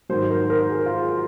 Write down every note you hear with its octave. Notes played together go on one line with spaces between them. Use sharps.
G#2 D#3 F#3 C5
A#4
A#4
G#4
F4